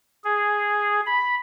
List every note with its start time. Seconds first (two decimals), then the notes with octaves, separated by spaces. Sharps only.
0.24 G#4
1.06 B5